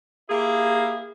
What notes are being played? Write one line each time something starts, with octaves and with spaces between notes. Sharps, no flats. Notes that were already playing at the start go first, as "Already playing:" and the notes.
A#3 E4 G4 G#4